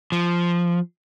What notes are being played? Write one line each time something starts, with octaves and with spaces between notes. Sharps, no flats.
F3